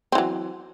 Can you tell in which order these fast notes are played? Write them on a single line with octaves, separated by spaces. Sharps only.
C4 E3 F#3